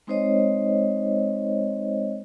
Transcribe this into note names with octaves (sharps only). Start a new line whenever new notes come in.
G#3 C4 D#4 C5 C#5 D#5